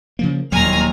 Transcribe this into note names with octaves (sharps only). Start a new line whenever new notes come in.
C#3 F3 A#3
E1 D#2 A#2 F#3 G3 G#5 A#5 F6